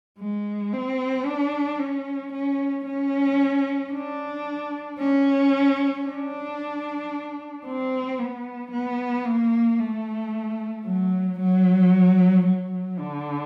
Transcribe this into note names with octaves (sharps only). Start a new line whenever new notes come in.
G#3
C4
D4
C#4
C#4
C#4
D4
C#4
D4
C4
B3
B3
A#3
A3
F#3
F#3
F#3
D3